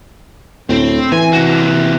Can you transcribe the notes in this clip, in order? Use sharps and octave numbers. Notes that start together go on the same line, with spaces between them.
D2 A2 C4
E3 G#5
C3 F#4